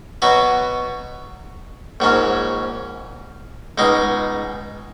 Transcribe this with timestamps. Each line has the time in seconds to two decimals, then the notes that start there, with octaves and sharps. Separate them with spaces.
0.22 B2 F#3 B3 F#4 B4
2.00 A#1 G#2 F#3 C#4
3.78 C#2 B2 G#3 D#4